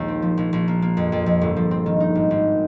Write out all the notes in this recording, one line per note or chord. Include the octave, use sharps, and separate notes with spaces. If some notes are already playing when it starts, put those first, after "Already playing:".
Already playing: A#1 D#2 G#3
C4
F3
A#1
A#1
A#3
A#3
F2
F2
F2
G1
F3
C4
D#3
D#4
G#1
G#1